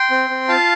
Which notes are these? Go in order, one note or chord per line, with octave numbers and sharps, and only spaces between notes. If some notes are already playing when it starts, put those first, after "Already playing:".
Already playing: G5 C6
C4
C4
F4 F5 A5